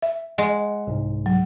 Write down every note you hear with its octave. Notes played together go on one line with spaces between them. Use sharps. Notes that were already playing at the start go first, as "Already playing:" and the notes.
E5
G#3 F#5
C2 G#2
F#3